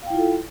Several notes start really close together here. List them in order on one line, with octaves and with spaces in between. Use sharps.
F5 G5 E4 F4 A4